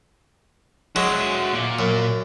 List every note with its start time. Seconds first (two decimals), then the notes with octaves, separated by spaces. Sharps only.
0.96 F#3 G#3 F#4 E5
1.53 A#2 D5
1.79 F#2